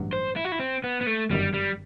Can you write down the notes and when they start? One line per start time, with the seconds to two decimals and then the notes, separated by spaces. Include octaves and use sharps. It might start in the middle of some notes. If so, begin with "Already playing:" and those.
Already playing: A1 G2 F#3
0.13 C5
0.36 E4
0.45 F#4
0.52 E4
0.60 C4
0.84 B3
1.01 B3
1.07 A3
1.31 G1 F#2 D#3 G3
1.54 G3